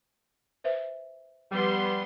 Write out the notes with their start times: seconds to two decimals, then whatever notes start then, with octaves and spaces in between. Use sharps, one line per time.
0.64 B4 C5 E5
1.51 F3 G3 B3 G4 C6